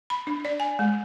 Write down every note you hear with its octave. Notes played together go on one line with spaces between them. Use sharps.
B5
D4
D5
G#5
G#3